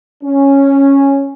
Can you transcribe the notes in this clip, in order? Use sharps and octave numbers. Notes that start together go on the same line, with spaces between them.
C#4